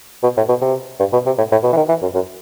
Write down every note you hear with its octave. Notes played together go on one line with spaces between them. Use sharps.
B2
A2
B2
C3
G2
B2
C3
A2
A2
B2
E3
D#3
E3
F#2
F#2